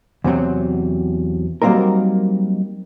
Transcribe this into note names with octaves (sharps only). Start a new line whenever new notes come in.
E2 C3 F#3 C4
F#3 G3 A#3 C4 D#4 A#4